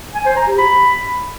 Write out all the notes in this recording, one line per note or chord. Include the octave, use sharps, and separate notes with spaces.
G#5
C5
A#5
G4
B5